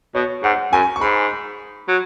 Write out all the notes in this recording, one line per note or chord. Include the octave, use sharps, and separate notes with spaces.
B2 C#5
G#2 F#5
F#2 G#5
C#6
G#2 B5
F#3